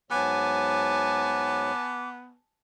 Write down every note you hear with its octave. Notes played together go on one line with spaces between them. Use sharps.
G#2 F#3 B3 G#5 A5 D6